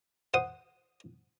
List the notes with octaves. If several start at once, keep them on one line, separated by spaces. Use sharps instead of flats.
C5 F#5 D#6